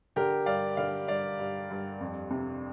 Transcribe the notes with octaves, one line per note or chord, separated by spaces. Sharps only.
D3 G4 A#4
G2 D5 F5
D3 D5 F5
G2 D5 F5
G2
G2
F2
C3